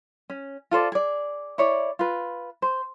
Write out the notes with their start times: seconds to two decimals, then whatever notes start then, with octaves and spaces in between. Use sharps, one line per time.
0.30 C#4
0.71 F4 A4 C5 D5
0.92 G#4 D5
1.58 E4 C#5 D5
1.99 F4 B4
2.62 C5